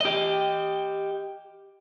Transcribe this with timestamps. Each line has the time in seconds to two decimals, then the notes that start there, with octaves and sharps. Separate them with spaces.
0.01 G4 D#5